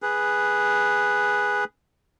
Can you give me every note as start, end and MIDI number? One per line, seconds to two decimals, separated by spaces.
0.02 1.64 68
0.02 1.64 71